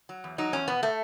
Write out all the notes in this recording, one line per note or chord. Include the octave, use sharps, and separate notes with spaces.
F#3
E2
F#3 D#4
E2 C#4
B2 B3
A3